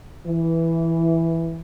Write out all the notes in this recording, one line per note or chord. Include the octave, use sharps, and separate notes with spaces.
E3